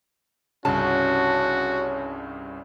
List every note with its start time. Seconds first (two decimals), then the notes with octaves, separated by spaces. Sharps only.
0.65 C2 G2 C#3 C#4 F#4 A5